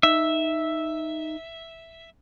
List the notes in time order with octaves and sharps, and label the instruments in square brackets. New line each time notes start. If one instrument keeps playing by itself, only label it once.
[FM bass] D#4 [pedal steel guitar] E5